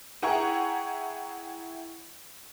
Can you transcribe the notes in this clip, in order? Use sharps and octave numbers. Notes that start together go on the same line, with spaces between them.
E4 G#4 F#5 G5 A#5 C#6